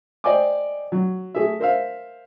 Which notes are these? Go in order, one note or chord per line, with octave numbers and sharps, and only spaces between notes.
C5 D5 D#5 G5 G#5 D6
F#3
A3 G#4 E5
A#4 C5 E5 F5